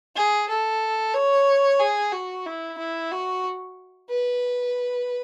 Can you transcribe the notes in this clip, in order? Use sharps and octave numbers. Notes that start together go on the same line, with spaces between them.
G#4
A4
C#5
G#4
F#4
E4
E4
F#4
B4